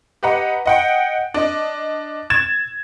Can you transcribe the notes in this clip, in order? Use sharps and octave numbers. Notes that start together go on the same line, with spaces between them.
G4 B4 D#5 F#5 A#5
D#5 F#5 G5
D4 D#5
G#6 A6 E7